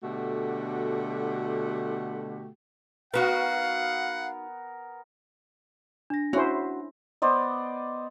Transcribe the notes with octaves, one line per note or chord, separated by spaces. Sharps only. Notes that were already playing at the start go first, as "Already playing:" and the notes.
B2 D3 A3 F#4 G4
B3 D#4 F#4 A#4 B4 F5 F#5
D4 A#6
C#4 E4 F#4 C5
B3 C5 D5 D#5